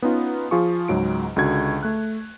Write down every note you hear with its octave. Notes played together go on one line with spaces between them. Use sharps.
B3 C#4 D#4 F4
F3 F4 G#4 C#6
C#2 G#2 F#3 D7
C#2 D3 F#4 G#6
A3 F#6